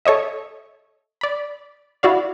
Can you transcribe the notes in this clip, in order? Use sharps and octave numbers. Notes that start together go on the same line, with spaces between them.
A4 C#5 D#5 E5
D5 B5
E4 F#4 D5 F5